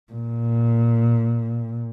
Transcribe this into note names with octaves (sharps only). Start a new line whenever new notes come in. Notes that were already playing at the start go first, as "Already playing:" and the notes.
A#2